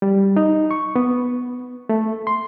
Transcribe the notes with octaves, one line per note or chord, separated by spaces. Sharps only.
G3
D#4
C#6
B3
A3
C6